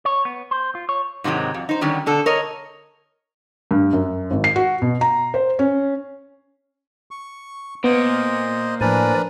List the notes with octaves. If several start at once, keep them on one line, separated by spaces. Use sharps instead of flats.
C#5
B3
C5
F4
C#5
G#2 C3 D#3 F#3 G#3
F2
D#4 C5
D3 D#3 F#3 G3 C#4 G4
B2 D3 A4
A#4 C#5 D#5
G2
F#2
G#1
C7
F#4
B2
A#5
C5
C#4
C#6
A#2 B3 C5 D#5
A2 F3 D4 A#4 B4 D5 G#5